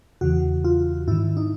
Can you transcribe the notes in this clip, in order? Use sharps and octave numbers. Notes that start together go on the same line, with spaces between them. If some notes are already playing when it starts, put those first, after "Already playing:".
E2 C#3 E3 F#4
F4
G#2 D#3 E4
D#4